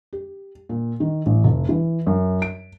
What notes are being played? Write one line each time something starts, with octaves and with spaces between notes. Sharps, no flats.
G4
A#2
D#3
A1
F1
E3
F#2
D7